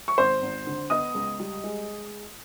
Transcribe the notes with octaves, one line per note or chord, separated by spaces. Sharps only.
C#6
G#1 C5 C6
G#1
D3
B3 D#5 D#6
C#2
G3
G#3